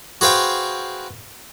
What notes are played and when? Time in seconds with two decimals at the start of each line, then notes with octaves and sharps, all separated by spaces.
0.21 F#4 G#4 B4 C5 F5 G5